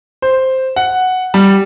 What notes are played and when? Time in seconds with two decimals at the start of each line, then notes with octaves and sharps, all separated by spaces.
0.22 C5
0.76 F#5
1.34 G3